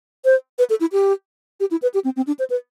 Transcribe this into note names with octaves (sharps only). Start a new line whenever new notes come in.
C5
B4
A4
E4
G4
G4
E4
B4
G4
C4
C4
D4
C5
B4